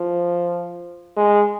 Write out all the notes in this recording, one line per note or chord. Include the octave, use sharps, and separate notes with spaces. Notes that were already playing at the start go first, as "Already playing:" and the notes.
Already playing: F3
G#3